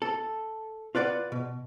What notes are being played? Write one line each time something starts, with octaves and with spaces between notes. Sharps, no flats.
A4
F4 B4 D5 F#5
B2